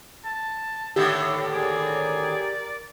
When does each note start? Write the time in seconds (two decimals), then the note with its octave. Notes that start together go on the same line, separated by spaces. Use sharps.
0.25 A5
0.96 D#2 A2 D3 G4 E5
1.54 G#4 A#4 D5